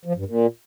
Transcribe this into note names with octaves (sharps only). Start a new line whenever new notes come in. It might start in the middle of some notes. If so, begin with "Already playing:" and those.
F3
G2
A#2